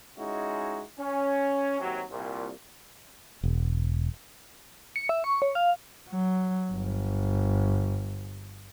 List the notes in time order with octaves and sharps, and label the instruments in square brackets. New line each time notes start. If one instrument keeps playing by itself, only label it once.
[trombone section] G#3 C#4 D#4 E4 F#4
C#4
D#2 C3 F#3
C2 A#2
[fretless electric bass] E1
[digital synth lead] C#7
E5
C#6
C#5
F5
[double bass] F#3
G1